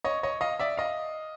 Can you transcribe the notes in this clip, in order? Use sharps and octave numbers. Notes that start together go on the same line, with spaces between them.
C#5 D#5
C#5 D#5
D#5 F5
D5 E5
D#5 F5